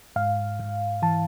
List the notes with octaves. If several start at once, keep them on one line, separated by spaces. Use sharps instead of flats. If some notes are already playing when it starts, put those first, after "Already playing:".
G#2 F5
G#2
E3 A5